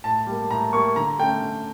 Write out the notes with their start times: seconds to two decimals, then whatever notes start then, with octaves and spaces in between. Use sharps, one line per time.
0.04 A2 A5
0.27 G3 A#3
0.51 A2 A#5
0.73 G3 A#3 C#6
0.96 D3 A#5
1.19 A3 C#4 G5
1.42 D3